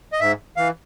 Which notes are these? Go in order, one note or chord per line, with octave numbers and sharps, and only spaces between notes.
D#5
G#2 E5
E3 F5